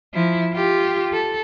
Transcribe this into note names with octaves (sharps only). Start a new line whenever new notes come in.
F3 E4
F4 G4
A4